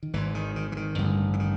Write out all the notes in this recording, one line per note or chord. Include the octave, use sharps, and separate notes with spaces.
D#3
G#1 G#2 E3
D#3
D#3
E3
D#3
A1 G2 D3
E3
D#3